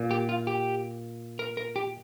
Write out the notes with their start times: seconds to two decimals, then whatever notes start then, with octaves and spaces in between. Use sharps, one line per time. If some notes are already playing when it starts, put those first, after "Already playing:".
Already playing: A#2
0.11 G4
0.29 F4
0.47 G4
1.39 A#4
1.57 A#4
1.76 G4